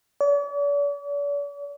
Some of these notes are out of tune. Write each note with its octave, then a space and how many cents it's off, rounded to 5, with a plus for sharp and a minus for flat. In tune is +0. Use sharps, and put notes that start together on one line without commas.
D5 -45